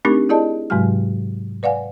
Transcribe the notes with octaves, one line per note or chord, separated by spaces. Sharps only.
A3 C4 D4 D#4 G4 A#4
E4 G#4 D5 D#5 A5
G#2 C3 F#3 G#3 F#4 F6
B4 D5 F5 F#5 G#5